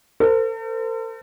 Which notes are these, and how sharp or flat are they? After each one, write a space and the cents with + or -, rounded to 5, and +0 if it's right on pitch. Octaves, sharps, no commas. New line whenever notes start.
A4 +45 C5 -35